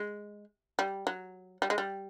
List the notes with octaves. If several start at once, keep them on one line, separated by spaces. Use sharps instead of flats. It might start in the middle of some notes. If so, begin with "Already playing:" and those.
Already playing: G#3
G3
F#3
G3
G#3
G3